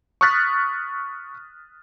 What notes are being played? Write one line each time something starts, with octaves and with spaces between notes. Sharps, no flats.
C#6 D#6 F6 F#6 A6 B6